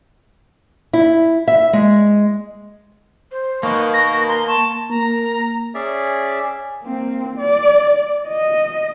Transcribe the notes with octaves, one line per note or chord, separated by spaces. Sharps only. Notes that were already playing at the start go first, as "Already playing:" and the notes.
E4
E5
G#3
C5
B2 D#3 A#3 C#6
A#6
A#5 C6
A5 C#6
A#3 A#5
C#4 G#4 D5 E5
A#3 C4
D5
D#5